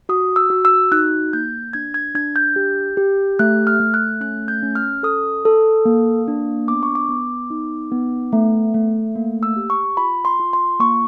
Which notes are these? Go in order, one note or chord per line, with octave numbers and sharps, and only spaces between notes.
F#4 D#6
E6
F#4
E6
D#4 F#6
A#3 G6
D4 G#6
G#6
D4 G#6
G6
G4
G4
A3 F#6
F6
A3
F#6
C#4 F#6
G6
C#4
F6
A4 D#6
A4
A#3
D4
B3 D6
C#6
D6
B3
D#4
B3
A3
A3
A#3
E6
G4
C#6
F4 B5
C6
F4
C6
A#3 C#6